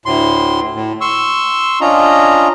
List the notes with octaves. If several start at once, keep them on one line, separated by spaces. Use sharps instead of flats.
D2 A2 C6
A2
C6 C#6 E6
C#4 D4 F4 D#5 A#5